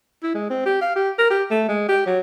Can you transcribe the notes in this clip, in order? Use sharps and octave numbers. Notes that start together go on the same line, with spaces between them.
E4
G#3
C4
G4
F5
G4
A#4
G4
A3
G#3
G4
F#3